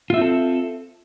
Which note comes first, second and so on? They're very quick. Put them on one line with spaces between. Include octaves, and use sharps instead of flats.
F4 E5 C4 A4